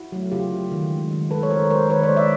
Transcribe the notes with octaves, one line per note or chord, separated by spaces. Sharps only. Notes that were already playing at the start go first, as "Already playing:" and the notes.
Already playing: E4 F#4
F#3 A3
C#3 F4 G4
F#3 A3
D#3
G#3
D#3
G#3 A4 B4
C#5
D#3 A#4 C5
G#3 A#4 C5
D#3 B4 C#5
C5 D5
G#3
D5 E5